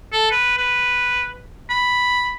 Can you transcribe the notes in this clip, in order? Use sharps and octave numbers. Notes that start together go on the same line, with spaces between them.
A4
B4
B4
B5